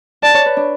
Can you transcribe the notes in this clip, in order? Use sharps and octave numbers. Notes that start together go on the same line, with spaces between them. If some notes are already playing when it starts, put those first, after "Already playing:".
D5 A5
C#5
B4
D4